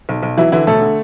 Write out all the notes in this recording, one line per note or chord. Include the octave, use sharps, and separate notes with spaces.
B1
B1
E3 F#3 E4
D3 E3 E4
E1 A3 A4
D3